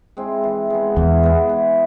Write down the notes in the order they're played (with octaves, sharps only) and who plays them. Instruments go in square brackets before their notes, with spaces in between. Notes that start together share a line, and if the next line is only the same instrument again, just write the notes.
[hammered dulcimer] G#3 C4 E4
E3
G#3 B3
[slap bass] E2 [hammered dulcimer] E3
[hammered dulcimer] G#3 B3
E3